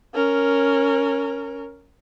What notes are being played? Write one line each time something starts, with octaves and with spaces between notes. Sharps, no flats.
C#4 A#4